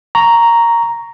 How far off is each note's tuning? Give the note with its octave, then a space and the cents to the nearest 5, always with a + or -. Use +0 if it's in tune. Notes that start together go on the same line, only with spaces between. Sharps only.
A#5 +0 C#6 +10